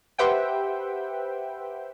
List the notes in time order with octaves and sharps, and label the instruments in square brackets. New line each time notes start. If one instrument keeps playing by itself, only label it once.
[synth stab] G4 B4 C5 E5 F#5 G5